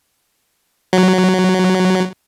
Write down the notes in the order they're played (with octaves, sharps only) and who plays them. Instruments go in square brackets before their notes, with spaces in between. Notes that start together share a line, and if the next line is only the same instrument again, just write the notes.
[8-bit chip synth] F#3